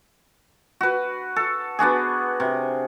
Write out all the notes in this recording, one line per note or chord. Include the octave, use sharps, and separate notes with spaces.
F#4 B4
A4
B3 D4 F#4 G#4
C3